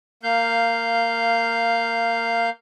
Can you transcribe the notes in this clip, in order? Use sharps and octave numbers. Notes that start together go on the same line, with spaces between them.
A#3 F5 G6